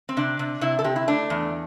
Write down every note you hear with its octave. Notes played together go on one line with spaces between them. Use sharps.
C4
C3 D4
C3
C3 E4
A4
C3 G4
E4
A3 D4
E2